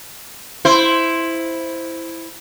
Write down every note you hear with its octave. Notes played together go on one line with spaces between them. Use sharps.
E4 C5